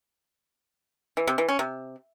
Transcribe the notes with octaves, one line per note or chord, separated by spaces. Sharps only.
E3
C3
E3
C#4
C3